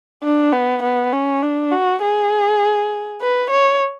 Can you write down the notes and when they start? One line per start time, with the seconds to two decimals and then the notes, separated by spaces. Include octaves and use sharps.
0.24 D4
0.53 B3
0.83 B3
1.13 C#4
1.42 D4
1.72 F#4
2.02 G#4
3.21 B4
3.50 C#5